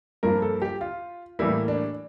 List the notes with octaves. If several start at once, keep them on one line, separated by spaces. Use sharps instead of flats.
G2 F3 A#3 A#4
A4
G4
F4
A2 E3 G3 A#3 E4
D4